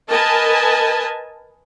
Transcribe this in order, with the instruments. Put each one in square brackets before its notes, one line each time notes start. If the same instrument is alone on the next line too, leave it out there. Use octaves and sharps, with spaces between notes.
[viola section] A#4 B4 D#5 G#5 A5